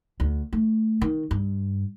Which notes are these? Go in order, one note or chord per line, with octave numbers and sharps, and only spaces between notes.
D2
A3
D#3
G2